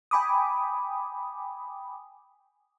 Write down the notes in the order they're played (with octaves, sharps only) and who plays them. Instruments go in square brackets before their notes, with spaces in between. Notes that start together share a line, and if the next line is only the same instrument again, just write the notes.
[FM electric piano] G5 G#5 B5 D6 D#6